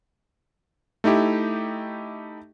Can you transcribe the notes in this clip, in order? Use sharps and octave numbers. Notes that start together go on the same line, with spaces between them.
A3 D#4 E4 G4